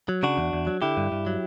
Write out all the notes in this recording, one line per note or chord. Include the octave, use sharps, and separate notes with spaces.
F#3
C#3 D4 F#4
E2
E2
F#3
D3 E4 G4
G2
G2
F#3